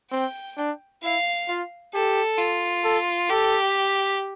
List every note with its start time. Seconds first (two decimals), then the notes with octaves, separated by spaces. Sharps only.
0.12 C4 G5
0.57 D4
1.03 E4 F5
1.48 F4
1.94 G4 A4
2.39 F4
2.84 A4
3.30 G4 A4